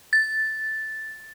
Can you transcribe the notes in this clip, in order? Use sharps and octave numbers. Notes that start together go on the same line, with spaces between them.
A6